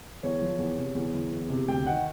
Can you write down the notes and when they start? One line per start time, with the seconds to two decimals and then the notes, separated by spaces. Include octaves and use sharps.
0.23 E2 C#5
0.41 F3
0.58 E2
0.77 C3
0.95 E2
1.14 E3
1.32 E2
1.50 C3
1.68 D2 G5
1.86 D#3 F#5